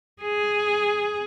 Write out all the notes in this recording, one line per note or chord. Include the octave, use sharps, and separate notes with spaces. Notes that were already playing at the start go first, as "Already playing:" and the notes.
G#4